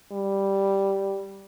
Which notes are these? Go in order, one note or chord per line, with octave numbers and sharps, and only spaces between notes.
G3